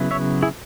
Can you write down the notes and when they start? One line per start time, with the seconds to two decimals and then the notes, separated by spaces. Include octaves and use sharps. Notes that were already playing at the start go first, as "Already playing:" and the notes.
Already playing: C#3 F#3 B3 E4
0.11 C#5 E5
0.42 E4 G#4